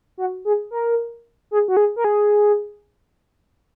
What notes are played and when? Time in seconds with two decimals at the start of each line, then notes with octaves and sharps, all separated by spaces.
0.18 F#4
0.45 G#4
0.71 A#4
1.51 G#4
1.68 F#4
1.77 G#4
1.96 A#4
2.04 G#4